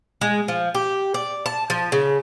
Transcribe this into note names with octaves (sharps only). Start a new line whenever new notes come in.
G#3
F3
G4
D5
A5
F3
C#3